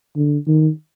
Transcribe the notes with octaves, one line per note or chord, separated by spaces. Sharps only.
D3
D#3